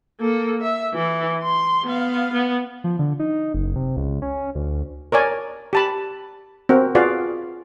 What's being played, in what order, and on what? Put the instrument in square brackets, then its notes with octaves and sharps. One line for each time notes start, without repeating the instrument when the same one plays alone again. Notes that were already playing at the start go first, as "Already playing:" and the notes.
[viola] A#3 A4
E5
E3
C6
B3 F5
B3
[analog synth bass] F3
D3
D#4
F#1
C3
C#2
C#4
D2
[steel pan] A#4 C#5 D5 G#5
G4 A5 B5
C4 F#4 A#4
F4 F#4 G#4 B4 D5 F5